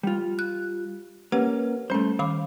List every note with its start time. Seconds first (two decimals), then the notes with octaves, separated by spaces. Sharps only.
0.03 G3 F4
0.39 F#6
1.32 A#3 C#4 G4 B4 F#5
1.90 G3 A3 C#4 C5
2.19 D#3 F5 B5 D6